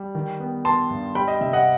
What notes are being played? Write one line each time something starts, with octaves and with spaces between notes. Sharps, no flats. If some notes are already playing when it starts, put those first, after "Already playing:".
Already playing: G3
D#3
B3
B3 A5 C6
G2
G3 G5 B5
D#5
C3 E5
D#5 F#5